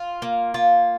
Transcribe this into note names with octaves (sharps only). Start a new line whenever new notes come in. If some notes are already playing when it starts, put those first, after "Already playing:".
Already playing: F4
A#3
F4